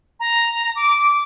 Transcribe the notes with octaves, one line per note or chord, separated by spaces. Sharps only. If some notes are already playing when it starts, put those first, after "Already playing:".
A#5
D6